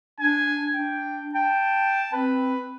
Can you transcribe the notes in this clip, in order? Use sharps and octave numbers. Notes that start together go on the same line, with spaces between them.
D4 G#5
D4 G5
G5 A5
C4 B4